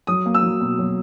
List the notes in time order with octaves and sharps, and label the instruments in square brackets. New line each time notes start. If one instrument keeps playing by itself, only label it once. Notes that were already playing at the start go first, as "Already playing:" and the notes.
[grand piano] F#3 D#6
A#3
E6
F#3
B2
F#3